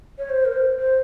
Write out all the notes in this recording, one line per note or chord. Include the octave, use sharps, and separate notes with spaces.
C#5
C5
A#4
C5
C5